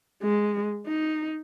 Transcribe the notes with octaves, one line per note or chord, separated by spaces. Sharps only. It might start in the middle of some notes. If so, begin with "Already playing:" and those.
G#3
D#4